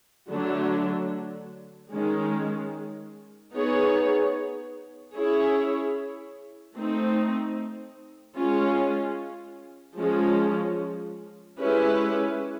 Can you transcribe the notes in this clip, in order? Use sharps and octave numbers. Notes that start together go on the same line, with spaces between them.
D3 F#3 A3 D4
D#3 G#3 C#4
B3 D#4 G#4 C#5
C#4 E4 G#4 C#5
A3 C4 D#4
G#3 C#4 F4
F3 G#3 C#4
G#3 C#4 E4 G4 B4